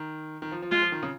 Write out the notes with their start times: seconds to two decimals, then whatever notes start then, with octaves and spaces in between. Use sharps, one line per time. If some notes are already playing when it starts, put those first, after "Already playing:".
Already playing: D#3
0.42 D#3
0.52 F3
0.62 F3
0.71 G#3 F4
0.82 F3
0.92 D#3
1.03 C#3